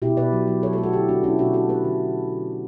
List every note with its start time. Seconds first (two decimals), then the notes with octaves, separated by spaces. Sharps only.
0.02 B2 E4 G4
0.17 B2 B4 D5
0.33 F#3
0.48 F#3
0.63 F#3 A4 C#5
0.73 A4 C#5
0.78 A3
0.83 F#4 A4
0.93 D3 E4 G4
1.08 A3 D4 F#4
1.24 A3 C#4 E4
1.39 B2 D4 F#4
1.54 A3 F#4 A4
1.69 A3 G4 B4
1.85 D3